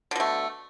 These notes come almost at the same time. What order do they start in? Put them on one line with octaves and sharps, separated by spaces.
D3 B2 A3